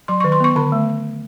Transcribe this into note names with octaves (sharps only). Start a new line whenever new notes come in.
F#3 C6
C#6
D#3
C6
B3 C#6
D3 B5
A3